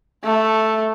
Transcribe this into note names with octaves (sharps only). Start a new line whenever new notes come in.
A3